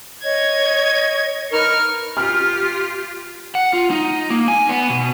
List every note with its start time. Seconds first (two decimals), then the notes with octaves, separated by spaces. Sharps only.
0.23 C#5 D#5 G#6
1.51 D#4 A#4 B4 C#6 F6
2.17 F4 G4 F6
3.55 F#5
3.73 F4
3.90 D#4
4.30 A#3
4.48 G#5
4.69 B3
4.90 B2